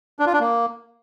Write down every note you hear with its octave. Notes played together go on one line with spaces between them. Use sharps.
D4
F4
D4
A#3